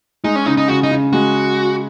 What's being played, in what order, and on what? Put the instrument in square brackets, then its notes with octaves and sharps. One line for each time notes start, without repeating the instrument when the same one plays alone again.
[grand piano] G#3 [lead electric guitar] D#4
[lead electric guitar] C#4
[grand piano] C#3 [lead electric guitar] D#4
[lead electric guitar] D#4
[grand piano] C#3 [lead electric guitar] F#4
[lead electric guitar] D#4
[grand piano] C#3
[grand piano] G#3 [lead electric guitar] F#4